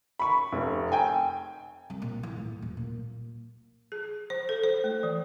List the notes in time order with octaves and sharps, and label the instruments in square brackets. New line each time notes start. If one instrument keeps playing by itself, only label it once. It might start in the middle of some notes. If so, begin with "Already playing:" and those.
[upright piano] B5 C#6
F1
G5 G#5
[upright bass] C2
A#2
E3
A2
D#1
A#2
[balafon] G#4
C5
A4
C5
A3
E3